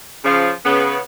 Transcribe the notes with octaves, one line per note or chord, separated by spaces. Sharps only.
C#3 F3
C#3 B3